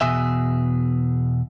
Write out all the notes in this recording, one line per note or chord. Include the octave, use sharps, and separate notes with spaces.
E2 B2 G#4 E5